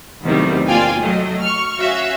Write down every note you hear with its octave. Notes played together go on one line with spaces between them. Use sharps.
E2 C3 D#3 F#3 G3 A3
A#3 F4 D5 F5 G5 G#5
F#3 A3 D#5
C#6 F6
C#4 F#4 E5 F5